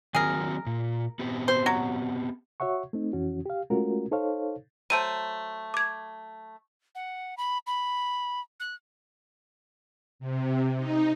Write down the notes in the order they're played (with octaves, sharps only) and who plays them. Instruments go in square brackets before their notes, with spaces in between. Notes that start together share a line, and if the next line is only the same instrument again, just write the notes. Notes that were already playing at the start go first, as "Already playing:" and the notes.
[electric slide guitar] D#3 F#3 C4 [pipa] G#4 A#4
[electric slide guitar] A#2
B3 C4 G4
[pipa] C5
F#3
[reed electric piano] F#4 C#5 E5 F#5 C#6
A3 C4 D#4
F2 E3 C#4 F#4
G4 F5
G#3 A3 C#4 F4 F#4 A#4
D#4 A4 C5 C#5 F5
[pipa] F#3 A3 C5 [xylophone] A5 D#7
[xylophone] D6 G#6
[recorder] F#5
B5
B5
F#6
[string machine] C3
D#4